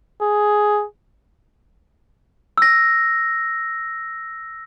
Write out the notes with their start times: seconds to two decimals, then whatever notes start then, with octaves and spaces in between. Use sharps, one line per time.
0.22 G#4
2.58 E6 A#6